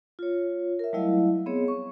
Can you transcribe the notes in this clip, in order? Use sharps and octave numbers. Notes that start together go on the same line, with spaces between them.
F4 C#5
A#4 E5
F#3 G3 A3 E4 D#5 F5
B3 C4 G#4 C#5
C#6